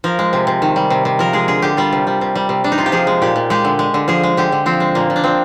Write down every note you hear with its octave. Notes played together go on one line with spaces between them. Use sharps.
F3 A#4
G#3
C3
C3
D#3
G3
C3
C3
F3 A#4
G#3 G#4
D3 G#4
D3 G4
G3 F4
C3
G3
C3
G3
C3
G3 D4
D#4
C3 F4
G4
F3 G#4
G#3
A#2 G4
A#2
G#3 G4
D3
G#3
D3
F3 G#4
G#3
D3 G4
D3
F3 C4
G#3
A#2 A#3
A#2
D4
F3 C4